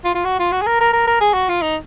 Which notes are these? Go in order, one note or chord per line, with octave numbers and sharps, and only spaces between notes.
F4
F4
F#4
F4
F#4
G#4
A#4
A#4
A#4
A#4
G#4
F#4
F4
D#4